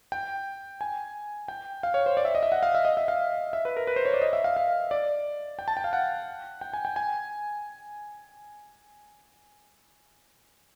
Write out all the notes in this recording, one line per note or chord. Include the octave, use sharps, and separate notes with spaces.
G5
G#5
G5
F5
C#5
C5
D5
E5
D#5
E5
F#5
F5
E5
D#5
E5
F5
E5
B4
A#4
B4
C5
C#5
D5
D#5
E5
F5
F5
D5
G5
A5
G5
F5
F#5
G5
G#5
G5
G#5